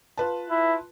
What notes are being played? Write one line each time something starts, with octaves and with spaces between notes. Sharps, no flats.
F4 B4 A5
E4